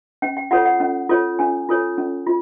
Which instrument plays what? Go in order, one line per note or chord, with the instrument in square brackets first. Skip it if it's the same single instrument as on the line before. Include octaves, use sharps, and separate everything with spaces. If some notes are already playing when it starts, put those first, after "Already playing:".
[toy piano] C#4 G5
G5
F4 A4 C#5 F#5
F#5
C#4
F4 A4 C#5
C#4 G#5
F4 A4 C#5
C#4
F4